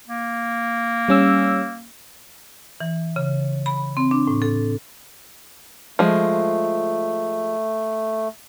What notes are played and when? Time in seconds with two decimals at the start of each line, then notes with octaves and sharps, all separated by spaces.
0.08 A#3
1.08 G3 C#4 E6
2.80 E3
3.16 C#3
3.66 B5
3.97 C4
4.11 D4
4.27 A2
4.42 A4
5.99 F3 G#3 A3